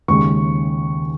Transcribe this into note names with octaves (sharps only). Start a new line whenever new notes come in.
D#2 C#3 G#3 C#6